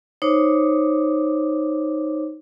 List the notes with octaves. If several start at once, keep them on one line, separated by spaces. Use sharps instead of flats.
D#4 C5 C#5 D6